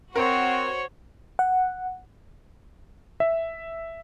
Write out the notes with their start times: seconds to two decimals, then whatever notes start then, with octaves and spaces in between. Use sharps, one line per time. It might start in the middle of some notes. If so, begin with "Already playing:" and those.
0.16 C4 F#4 A#4 C5 C#5 F#5
1.39 F#5
3.20 E5